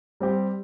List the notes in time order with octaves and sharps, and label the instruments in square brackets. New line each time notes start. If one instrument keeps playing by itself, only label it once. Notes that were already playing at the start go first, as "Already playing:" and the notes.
[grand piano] G3 C4 G4